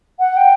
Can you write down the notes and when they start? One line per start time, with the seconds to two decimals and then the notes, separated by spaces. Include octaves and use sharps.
0.19 F#5
0.37 G5